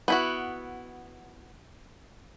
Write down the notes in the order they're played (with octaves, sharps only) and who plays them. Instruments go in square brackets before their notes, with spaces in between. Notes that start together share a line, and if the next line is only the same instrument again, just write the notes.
[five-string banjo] B3 E4 F#4